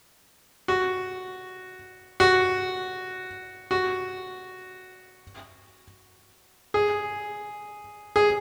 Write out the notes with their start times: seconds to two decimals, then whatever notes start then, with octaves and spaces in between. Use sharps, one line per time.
0.68 F#4
2.20 F#4
3.71 F#4
6.74 G#4
8.16 G#4